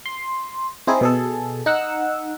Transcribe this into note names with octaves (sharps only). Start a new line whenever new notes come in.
C6
C4 D#4 E4 G#4
B2 G#4 A4
D#4 F#5 E6